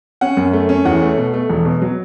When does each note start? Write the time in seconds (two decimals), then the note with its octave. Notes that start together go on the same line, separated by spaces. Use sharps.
0.21 C#4 F#5
0.37 F#2
0.53 A3
0.69 C#4
0.85 E2 F#5
1.02 A3
1.17 B2
1.34 A3
1.49 E1
1.65 B2
1.82 F#3